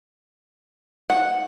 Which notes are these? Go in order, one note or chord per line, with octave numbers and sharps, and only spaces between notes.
F#5